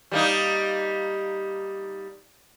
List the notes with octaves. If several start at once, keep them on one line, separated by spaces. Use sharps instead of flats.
G3 A#3 D#4